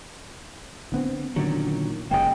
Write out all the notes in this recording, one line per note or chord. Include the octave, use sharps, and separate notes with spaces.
D3 B3 C4
A#2 D3 D#3 F#3 C#4
F#1 B2 G#3 A#3 C#4 D#5 G5